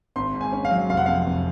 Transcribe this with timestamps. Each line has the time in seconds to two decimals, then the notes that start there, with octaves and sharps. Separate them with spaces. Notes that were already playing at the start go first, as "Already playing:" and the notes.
0.16 G#1 C6
0.34 G#2
0.41 G#5
0.52 C#4
0.65 F5
0.71 F#3
0.89 F1 F5
0.97 F#5
1.06 F2 F5
1.26 F1